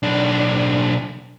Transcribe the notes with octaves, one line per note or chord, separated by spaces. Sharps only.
B1 D4